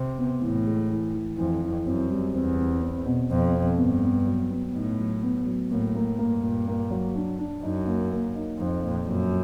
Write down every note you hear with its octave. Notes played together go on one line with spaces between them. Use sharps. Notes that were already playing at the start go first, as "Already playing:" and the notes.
Already playing: C3
B3
A2 E3
G#3
E3
E3
F2 E3
E3
F#2 C4
G3
E2 C4
C4
C4
B2
F2 B2
C4
G2 B3
B3
F#3
B3
A2 D#4
F#3
B3
F#3
A2 A#3
A#3
G2 A#3
A#2
A#3
F#3
D4
D4
F#2 D#4
A#3
A#3
D#4
F2 D#4
A#2
F#2 A#2